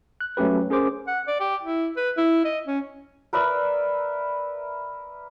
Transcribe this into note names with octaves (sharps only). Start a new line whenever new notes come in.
F#6
F#3 A3 C#4 G4 B4
C#4 G#4 A#4 C5 D6
F#5
D5
G4
E4
B4
E4
D#5
C#4
A#4 B4 D5 E5